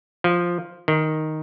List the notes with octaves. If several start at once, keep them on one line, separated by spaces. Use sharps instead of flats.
F3
D#3